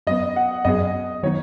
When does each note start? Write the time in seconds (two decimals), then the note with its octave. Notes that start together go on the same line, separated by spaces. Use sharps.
0.07 F#2 F#3 B3 D#5
0.36 F#5
0.65 F#2 F#3 B3 G#4 D#5
1.23 D#3 F#3 B3 D#4 C#5